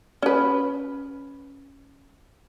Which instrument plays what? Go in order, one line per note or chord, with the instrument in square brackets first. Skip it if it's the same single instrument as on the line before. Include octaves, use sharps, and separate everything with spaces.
[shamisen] C#4 B4